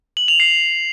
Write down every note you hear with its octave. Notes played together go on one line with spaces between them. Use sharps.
F#7
F7
C7